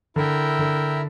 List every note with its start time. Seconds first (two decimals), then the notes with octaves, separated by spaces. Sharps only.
0.16 D3 E4 A#4 E5 G5
0.59 D3